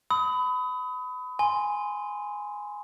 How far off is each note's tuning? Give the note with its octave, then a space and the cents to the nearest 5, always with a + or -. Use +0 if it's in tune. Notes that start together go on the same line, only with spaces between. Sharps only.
B5 +25 D#6 +30
G#5 +0 C6 +0